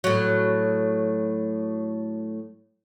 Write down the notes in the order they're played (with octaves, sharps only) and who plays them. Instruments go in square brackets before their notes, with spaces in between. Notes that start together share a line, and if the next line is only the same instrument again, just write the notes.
[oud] A2 F#3